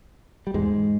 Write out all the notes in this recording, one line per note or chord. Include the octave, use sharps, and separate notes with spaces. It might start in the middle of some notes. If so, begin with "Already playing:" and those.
G3
E2 G#2 G#3